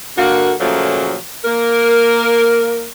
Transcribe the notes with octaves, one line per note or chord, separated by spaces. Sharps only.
D3 A#3 F#4
A#2 C#3 F3 F#3 A3 A#3
A#3 A#4